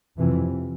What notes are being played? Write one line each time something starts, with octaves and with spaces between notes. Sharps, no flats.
F2 C3 E3